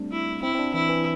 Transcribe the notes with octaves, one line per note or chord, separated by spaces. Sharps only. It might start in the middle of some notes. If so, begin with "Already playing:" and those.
Already playing: G3 A3 C4 D4
E4
C4 E4
C4
D4
E3 E4
E3